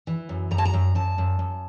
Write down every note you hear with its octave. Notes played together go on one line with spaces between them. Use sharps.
E3
F#2
F#2 A#5
A5
A#5
F#2
F#2 A5
F#2
F#2